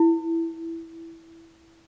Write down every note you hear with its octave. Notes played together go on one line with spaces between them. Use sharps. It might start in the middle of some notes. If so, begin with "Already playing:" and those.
Already playing: E4